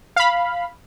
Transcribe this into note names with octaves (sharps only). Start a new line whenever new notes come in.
F5 B5